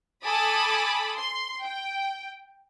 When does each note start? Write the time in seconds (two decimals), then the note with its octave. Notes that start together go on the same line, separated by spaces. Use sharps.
0.24 A4 G#5 A5 B5 D6 D#6
1.17 C6
1.62 G5